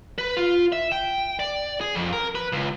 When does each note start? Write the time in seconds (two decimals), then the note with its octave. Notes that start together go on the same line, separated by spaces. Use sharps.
0.18 B4
0.37 F4
0.72 E5
0.92 G5
1.39 D5
1.81 G#4
1.95 F2
2.13 A#4
2.35 B4
2.52 C#2